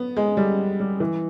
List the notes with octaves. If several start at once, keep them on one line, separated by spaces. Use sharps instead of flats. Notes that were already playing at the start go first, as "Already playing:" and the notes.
Already playing: B3
G#3
G3
G3
E3